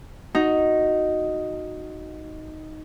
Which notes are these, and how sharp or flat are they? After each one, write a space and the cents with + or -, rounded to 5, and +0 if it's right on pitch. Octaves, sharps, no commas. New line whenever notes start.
D#4 +0 F#4 +0